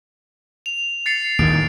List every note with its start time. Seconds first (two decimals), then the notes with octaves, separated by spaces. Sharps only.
0.66 F7
1.06 A6 C7 C#7
1.39 D#2 A2 D#3 D7